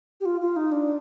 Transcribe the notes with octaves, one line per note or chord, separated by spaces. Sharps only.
G4
F4
F4
D#4
D4